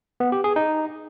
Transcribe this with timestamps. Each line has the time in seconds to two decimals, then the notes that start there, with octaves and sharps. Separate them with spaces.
0.20 B3
0.32 G4
0.44 G#4
0.56 D#4